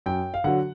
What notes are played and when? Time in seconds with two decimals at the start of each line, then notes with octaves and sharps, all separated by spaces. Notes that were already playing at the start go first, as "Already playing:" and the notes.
0.06 F#2 G5
0.34 F5
0.44 D3 F#3 F#5